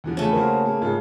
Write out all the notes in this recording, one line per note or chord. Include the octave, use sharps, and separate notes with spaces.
E2 D3 F3
C#3 A3 C#4
A#3 F#4 A#4 C5
A#3
G#2 C#3 F4